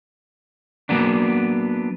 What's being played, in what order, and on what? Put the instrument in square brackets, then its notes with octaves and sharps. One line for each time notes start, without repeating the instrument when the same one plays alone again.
[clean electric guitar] F#3 A#3 B3 D4